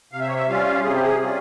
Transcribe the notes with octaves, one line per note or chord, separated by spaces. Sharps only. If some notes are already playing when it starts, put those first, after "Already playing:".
C3 F5
E5
C#5
E5
G3 C#4 F4 F5
C3 G#4
G4
G#4
G3 C#4 F4